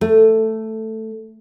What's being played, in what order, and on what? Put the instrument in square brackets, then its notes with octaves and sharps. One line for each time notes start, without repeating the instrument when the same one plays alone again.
[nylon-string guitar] A3